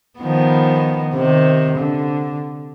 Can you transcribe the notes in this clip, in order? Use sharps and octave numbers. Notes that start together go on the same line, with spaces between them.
D#3 F3 B3
C3 D#3
D3